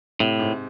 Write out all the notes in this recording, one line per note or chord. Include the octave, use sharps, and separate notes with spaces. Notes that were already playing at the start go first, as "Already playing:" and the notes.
A2 C3
G#2